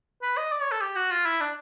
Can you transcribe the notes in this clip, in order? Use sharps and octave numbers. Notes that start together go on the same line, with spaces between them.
B4
D#5
D5
C#5
A4
G4
F#4
F4
E4
D4